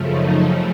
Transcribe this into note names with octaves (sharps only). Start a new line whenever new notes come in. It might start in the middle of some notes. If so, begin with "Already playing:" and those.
Already playing: F#2 C#3 F3 A3
D#4